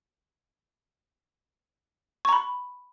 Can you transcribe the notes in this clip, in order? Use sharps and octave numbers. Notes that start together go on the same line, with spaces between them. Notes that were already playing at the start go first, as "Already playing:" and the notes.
A#5 B5 C#6